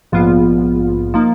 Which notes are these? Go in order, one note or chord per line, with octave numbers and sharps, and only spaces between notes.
A#1 G#2 F3 B3 F4
F3 A#3 D#4